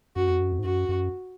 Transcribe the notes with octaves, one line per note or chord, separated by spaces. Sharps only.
F#2 F#4
F2
F#2
F2
G#2
F#2 F#4
F#2